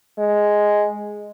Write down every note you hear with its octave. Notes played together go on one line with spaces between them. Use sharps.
G#3